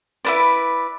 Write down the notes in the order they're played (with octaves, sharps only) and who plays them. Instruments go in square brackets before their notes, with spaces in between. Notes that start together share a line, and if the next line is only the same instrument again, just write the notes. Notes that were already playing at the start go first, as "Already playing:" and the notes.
[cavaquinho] E4 B4 D5